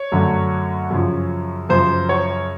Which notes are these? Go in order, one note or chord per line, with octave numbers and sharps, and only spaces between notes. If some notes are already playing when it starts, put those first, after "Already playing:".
Already playing: C#5
F#2 D3 F#3 A3
F#2 C#3 F3
F#2 C#3 F3 C5
C#5